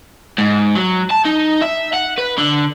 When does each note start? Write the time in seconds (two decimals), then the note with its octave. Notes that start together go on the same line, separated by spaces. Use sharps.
0.38 G#2
0.75 F#3
1.11 A5
1.26 D#4
1.62 E5
1.94 F#5
2.18 B4
2.38 D3